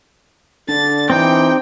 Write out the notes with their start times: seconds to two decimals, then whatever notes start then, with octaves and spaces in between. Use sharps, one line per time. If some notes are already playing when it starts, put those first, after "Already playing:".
0.69 D3 D4 A6
1.10 E3 C4 D#4 G4 G5